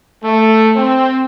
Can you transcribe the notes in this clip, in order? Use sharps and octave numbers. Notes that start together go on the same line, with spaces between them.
A3
C4